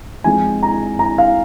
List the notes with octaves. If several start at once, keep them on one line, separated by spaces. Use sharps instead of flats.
F3 G#3 C4 D#4 G#5
A#5
A#5
F5